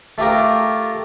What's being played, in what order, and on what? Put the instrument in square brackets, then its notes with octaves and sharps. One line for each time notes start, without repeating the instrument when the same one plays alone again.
[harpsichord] A3 F4 G4 A#4